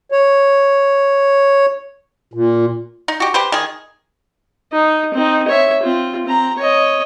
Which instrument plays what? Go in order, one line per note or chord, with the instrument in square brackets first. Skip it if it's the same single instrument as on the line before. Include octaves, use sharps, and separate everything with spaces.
[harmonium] C#5
A#2
[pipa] D#4
F#4 G4
G4 B4 C5
D#3 G#4
[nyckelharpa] D#4
C4 D#4
C#5 E5
C4 F4
C4 A#5
C#5 D#5